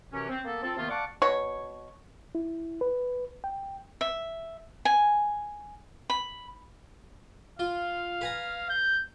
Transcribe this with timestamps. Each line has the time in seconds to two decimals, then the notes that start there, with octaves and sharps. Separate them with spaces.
0.12 F#2 C3 E3 C#4
0.29 C4
0.45 A#3 B3 A4
0.63 C4 F4 A4
0.77 C3 D#3 A#3 B3 F4
0.89 D5 F5 F#5 A5 C#6 D6
1.22 B2 C#5 C#6
2.35 E4
2.81 B4
3.44 G5
4.01 E5
4.85 G#5
6.10 B5
7.59 F4 F5
8.21 B4 G#5 A#5
8.69 G6